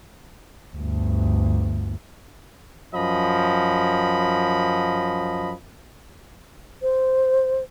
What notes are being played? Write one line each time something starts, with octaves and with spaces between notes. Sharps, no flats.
G1 D2
F#2 F3 D#5 B5
C5